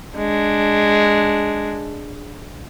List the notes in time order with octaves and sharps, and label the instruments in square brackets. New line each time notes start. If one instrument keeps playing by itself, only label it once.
[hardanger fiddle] G#3 D4